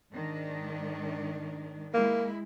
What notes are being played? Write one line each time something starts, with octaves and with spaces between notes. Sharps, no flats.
G#2 D#3 D4
G#3 A#3 E4